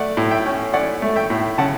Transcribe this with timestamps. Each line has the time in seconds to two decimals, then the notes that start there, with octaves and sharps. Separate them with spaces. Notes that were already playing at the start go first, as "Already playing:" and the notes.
Already playing: A3 D5 F#5
0.17 A2
0.31 E5 G5
0.46 C#4
0.74 C#4 D5 F#5
1.02 A3
1.16 E5 G5
1.30 A2
1.58 C#3 F#5 A5